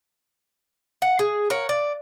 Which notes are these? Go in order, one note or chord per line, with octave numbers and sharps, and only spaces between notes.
F#5
G#4
A#4 C#5 F#5
D5